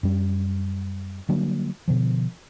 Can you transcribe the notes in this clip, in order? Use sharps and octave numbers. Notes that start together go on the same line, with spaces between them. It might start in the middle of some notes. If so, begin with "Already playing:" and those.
F#2 G3
D3 F#3 G3 A#3
B2 D3 F3